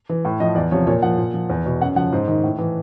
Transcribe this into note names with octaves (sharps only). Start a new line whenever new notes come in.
E3
A2
F3 D#5
E2 D5
C3 F3 C#5
A#2 C#5
F3 F#5
A#2
F3
E2
B2
F#2 F#5
C#3 F3 F#5
G#2 C5
D#3
A2
E3